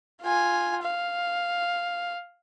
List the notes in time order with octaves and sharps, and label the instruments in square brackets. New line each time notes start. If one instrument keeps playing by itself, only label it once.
[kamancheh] F4 G#5
F5